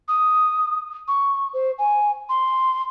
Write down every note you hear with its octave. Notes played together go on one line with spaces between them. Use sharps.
D#6
C#6
C5
G#5
C6